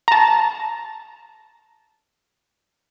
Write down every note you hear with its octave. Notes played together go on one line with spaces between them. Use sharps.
A5 A#5